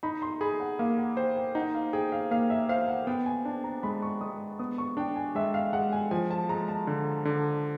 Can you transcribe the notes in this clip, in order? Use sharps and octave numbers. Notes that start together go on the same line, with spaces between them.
D#4 B5
C6
G#4 B5
F#5
A#3 F5
F#5
C5 G5
G5
D#4 F#5
F5
G#4 G5
F5
A#3 F5
E5
C5 F5
F#5
B3 G5
G#5
D4 A5
A#5
G#3 B5
C#6
G#3 D#6
B3 D#6
C#6
D4 G5
G#5
G#3 E5
F5
G#3 F#5
G#5
F3 G#5
A5
G#3 A#5
A5
D3
D3